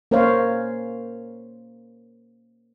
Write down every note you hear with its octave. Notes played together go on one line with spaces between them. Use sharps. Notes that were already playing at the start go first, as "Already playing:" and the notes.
A#3 C#4 A#4 C5 C#5 F5